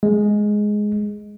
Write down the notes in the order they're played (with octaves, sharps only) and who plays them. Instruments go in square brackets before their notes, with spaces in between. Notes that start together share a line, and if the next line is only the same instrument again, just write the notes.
[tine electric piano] G#3